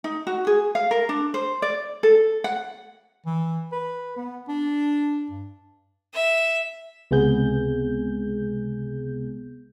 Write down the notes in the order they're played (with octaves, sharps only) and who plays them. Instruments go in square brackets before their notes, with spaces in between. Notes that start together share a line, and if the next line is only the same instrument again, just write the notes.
[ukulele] D#4
F#4
G#4
F5
A#4
D4
C5
D5
A4
F#5
[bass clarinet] E3
B4
B3
D4
G2
[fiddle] E5
[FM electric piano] C#2 C3 G#3 B3 G#4 G6